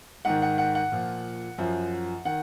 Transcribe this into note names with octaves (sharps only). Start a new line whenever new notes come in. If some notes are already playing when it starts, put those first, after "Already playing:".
G#2 D#3 F#5
F#5
F#5
F#5
A#2 F3
F#2 F3
D#3 F#5